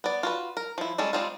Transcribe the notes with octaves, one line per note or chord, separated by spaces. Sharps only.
B3 D5
F4 F#4 B4
A#4
F3 E4
G3 G#3 C#4 A4
G3 G#3 C4 D#4 F4